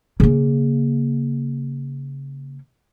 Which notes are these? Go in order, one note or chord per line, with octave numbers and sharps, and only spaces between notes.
C#3 A#3